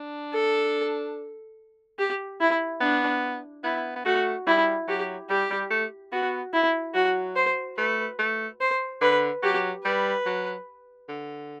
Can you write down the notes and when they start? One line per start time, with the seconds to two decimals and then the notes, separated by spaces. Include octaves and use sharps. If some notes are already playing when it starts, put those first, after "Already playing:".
Already playing: D4
0.34 A4
1.99 G4
2.40 E4
2.81 B3 D4
3.64 B3 E4
3.96 B3
4.05 A3 F#4
4.47 G3 E4
4.88 F#3 G4
5.30 G3 G4
5.51 G3
5.70 A3
6.12 B3 F#4
6.53 E4
6.94 F#3 F#4
7.36 C5
7.77 A3 B4
8.19 A3
8.61 C5
9.01 D3 B4
9.42 F#3 G4
9.84 G3 B4
10.26 F#3
11.08 D3